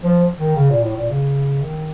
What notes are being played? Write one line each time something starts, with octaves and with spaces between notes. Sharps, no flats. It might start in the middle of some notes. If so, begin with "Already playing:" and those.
F3
D#3
C#3
A#2
A2
A#2
C#3
D#3